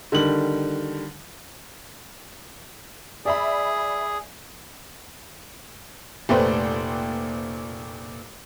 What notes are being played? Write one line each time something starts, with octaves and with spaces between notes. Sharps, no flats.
D3 D#3 G3 F#7
G#4 D5 E5 B5
F1 A#2 A3 B4 C5 G5